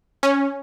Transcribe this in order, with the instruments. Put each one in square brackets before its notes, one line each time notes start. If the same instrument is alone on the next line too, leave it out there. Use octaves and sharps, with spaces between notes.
[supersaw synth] C#4